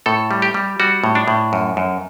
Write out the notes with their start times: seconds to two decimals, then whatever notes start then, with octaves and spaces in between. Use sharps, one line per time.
0.06 A2 A4
0.31 G3
0.42 G4
0.54 G3
0.80 G3 F#4
1.04 A2
1.15 D4
1.28 A2
1.53 F#2
1.77 F#2